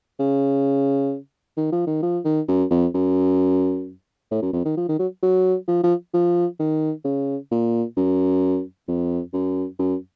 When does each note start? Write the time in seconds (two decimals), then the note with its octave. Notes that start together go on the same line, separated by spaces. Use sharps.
0.19 C#3
1.57 D#3
1.72 F3
1.87 D#3
2.03 F3
2.25 D#3
2.48 F#2
2.70 F2
2.94 F#2
4.31 A2
4.42 F#2
4.53 F2
4.65 D#3
4.77 F3
4.89 D#3
4.99 F#3
5.23 F#3
5.68 F3
5.83 F3
6.14 F3
6.59 D#3
7.04 C#3
7.51 A#2
7.97 F#2
8.88 F2
9.33 F#2
9.79 F#2